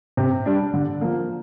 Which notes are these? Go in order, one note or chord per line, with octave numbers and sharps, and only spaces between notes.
C3
G3 D4
D3
F3 A#3